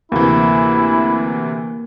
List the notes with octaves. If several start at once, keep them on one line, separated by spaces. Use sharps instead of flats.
D2 C3 E3 A#3 E4